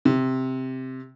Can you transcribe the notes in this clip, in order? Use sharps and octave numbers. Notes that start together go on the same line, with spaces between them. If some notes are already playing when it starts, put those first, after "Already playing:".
C3